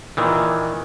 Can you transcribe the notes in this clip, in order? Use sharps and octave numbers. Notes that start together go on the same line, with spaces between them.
A#2 D#3 E3